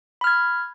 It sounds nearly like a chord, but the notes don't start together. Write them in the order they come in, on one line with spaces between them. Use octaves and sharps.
B5 F6 G#6